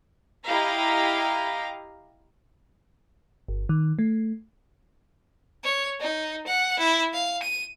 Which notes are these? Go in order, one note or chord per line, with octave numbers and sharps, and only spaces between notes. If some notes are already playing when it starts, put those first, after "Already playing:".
E4 G4 D#5 F5 A#5
G1
D#3
A3
C#5
D#4
F#5
E4
F5
D#7